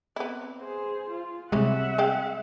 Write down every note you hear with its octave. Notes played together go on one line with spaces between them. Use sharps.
B3 C4 E4
G#4 C5
F4
C3 E3 G3 G#3 C#4 E5 F#5
G#4 F5 G5